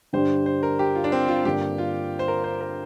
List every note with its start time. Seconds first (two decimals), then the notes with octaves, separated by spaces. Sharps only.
0.13 G2 D3 G3 D4 G4 C5
0.46 C5
0.63 A#4
0.79 G4
0.95 F4
1.04 D4
1.12 C4
1.28 F4
1.45 G2 D3 A#3 D4 G4
1.78 F4
2.19 C5
2.28 A#4
2.44 C5
2.61 A#4